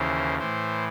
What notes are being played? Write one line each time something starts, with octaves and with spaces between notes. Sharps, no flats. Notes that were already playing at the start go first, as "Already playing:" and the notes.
Already playing: D#2 C#3 E3 C5
A2 E3 C5